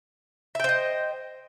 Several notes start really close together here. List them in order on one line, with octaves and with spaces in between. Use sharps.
E5 G5 C5 D#5